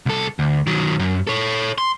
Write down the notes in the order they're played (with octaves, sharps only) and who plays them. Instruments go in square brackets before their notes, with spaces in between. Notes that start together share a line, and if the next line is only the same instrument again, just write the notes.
[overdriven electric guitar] C2 A4
D2
D#3 F#3
F#2
A4 C#5
C6